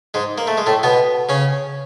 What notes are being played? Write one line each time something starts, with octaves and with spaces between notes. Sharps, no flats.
G#2 G#3
A#3
A3
G#3
A2 A3
B2 B3
C#3 C#4